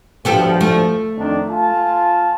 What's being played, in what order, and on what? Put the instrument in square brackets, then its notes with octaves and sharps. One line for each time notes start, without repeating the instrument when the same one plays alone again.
[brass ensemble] D2 G2 F3 [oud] B3 G4 A4
[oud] A3
[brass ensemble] F2 D#3 D4
F4 G#5 A5